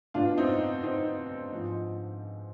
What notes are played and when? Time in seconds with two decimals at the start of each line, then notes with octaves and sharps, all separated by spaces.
0.14 B2 D4 F4
0.37 C4 D#4
0.83 C4 D#4
1.52 G#2 F3